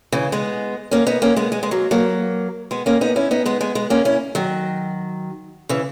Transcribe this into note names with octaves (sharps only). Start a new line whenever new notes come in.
C#3 E3
G#3 B3
A#3 C#4
B3 D#4
A#3 C#4
G#3 B3
G#3 B3
G#3
F#3 A#3
F#3 A#3
G#3 B3
A#3 C#4
B3 D#4
C#4 E4
B3 D#4
G#3 B3
G#3 B3
G#3 B3
A#3 C#4
C#4 E4
D#3 F#3
C#3 E3